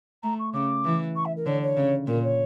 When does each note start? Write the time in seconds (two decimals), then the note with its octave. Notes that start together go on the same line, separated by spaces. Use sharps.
0.23 A3 A#5
0.39 C#6
0.53 C#3 D6
0.84 E3
1.15 C#6
1.25 E5
1.36 A#4
1.46 D3 C#5
1.62 C#5
1.76 C#3
2.07 A#2 A#4
2.23 C#5